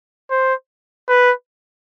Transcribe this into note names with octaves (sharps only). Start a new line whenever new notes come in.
C5
B4